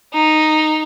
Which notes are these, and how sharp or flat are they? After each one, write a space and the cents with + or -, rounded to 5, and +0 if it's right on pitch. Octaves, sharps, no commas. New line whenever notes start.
D#4 -5